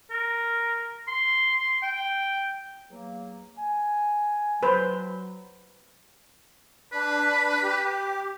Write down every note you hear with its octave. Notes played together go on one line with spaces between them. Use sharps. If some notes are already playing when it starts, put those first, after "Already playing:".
A#4
C6
G5
E2 F#3 A#3
G#5
F#3 B4 C5
D4 B4
G4